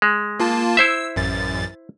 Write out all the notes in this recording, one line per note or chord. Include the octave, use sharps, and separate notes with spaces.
G#3
A#3 F4 A5
E4 C5 E5 E6
A1 F#2 A6